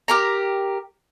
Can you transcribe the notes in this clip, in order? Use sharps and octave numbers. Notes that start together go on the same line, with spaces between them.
G4 A#4 A#5